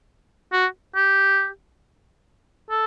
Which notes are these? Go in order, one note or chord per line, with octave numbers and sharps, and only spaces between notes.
F#4
G4
A4